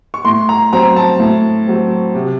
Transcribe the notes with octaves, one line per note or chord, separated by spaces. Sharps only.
C#6
A2 C6
A#5
F#3 C4 A#5
A5
A2
F#3 C4
C3